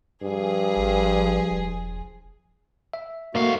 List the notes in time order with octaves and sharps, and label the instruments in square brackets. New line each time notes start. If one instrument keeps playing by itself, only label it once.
[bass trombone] G2 [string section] F3 G#4
[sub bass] G#1
E1
[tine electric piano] E5
[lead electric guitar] G#2 F5 [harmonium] A3 F#4 [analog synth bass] A#3